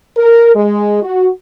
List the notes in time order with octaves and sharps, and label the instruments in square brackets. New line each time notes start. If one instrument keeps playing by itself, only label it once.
[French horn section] A#4
G#3
F#4